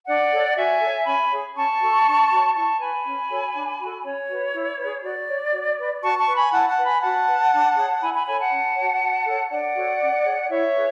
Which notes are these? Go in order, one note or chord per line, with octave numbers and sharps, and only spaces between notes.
D4 D5 F#5
A4 C#5
F#4 E5 G#5
A4 C#5
C#4 G#5 B5
G#4 C#5
C#4 A5 C#6
F#4 A4
D4
F#4 C#5
E4 A5 C#6
B4 G#5 B5
C#4
F#4 A4 C#5
D4
F#4 A4
C#4 C#5
F#4 B4
E4
G#4 B4
F#4 D5
C#5
F#4
B4
F#4 A5 C#6
A5 C#6
B4
G#5 B5
E4 F#5 A5
F#5 A5
B4
G#5 B5
F#4 F#5 A5
B4
D4
G#4 C#5
E4 G#5 B5
G#5 B5
A4 C#5 G#5 B5
F#5 A5
C#4
C#5
F#4
F#4
A4 C#5
D4 D5 F#5
F#4 A4 C#5
C#4
G#4 C#5
D5
E4 C#5 E5
G#4 B4